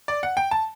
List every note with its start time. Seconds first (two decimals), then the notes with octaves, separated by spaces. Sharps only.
0.08 D5
0.23 F#5
0.37 G5
0.51 A5